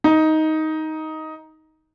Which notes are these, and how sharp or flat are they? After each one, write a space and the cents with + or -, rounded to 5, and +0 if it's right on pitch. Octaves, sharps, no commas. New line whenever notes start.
D#4 +10